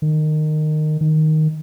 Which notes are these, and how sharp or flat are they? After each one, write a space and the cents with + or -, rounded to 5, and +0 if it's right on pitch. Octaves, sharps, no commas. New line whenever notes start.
D#3 -20
D#3 +0